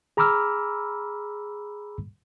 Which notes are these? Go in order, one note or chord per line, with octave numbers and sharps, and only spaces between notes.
G#4 A#5 B5 D6 E6 F6